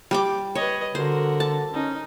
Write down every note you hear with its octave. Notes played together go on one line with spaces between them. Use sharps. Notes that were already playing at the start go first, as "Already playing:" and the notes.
G3 G5 D6
B4 C#5 D#5
D3 F#4 A#4 C5
A5
C#4 D#4